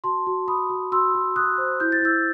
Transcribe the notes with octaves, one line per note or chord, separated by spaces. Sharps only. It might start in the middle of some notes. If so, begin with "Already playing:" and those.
F#4 A5 C6
F#4
F#4 B5 D#6
F#4
F#4 C6 E6
F#4
F#4 D#6 F#6
C5
E4 G6
A6
E4 E6 G6